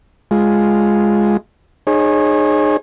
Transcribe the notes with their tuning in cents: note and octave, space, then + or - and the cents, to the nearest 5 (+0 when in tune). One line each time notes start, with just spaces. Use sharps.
G#3 +0 F4 +0
D#4 -35 G#4 +0 C#5 -40